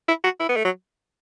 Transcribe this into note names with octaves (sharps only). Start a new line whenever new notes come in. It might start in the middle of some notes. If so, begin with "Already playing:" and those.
E4
F#4
E4
B3
A3
F#3